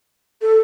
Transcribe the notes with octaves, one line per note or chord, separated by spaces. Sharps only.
A4